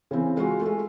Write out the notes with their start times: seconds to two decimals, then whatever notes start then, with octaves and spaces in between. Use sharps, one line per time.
0.11 C#3 E3 C4
0.37 G#3 F4 F#4
0.61 G#3 A3